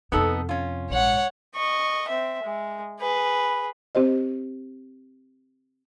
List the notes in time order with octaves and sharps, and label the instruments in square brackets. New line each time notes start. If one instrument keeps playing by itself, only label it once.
[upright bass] F2 C3 [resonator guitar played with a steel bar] B3 D#4 A4
[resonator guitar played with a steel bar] C#4 F4
[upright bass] A#1 G#2 [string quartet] C#5 F#5
[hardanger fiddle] D#5 C#6
C4 E5
G#3
G#4 B4
[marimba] C4 G4 C5 D#5